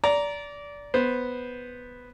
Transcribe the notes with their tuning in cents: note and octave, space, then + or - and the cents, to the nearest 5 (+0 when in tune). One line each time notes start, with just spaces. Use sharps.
D5 -20 A#5 +5
B3 +0 C5 +0